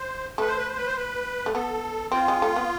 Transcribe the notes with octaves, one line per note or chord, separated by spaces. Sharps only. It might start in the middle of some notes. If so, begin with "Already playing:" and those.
Already playing: C5
A3 B4
C5
B4
C5
B4
C5
B4
A3
B3 A4
C4 F4
G#3
A3
B3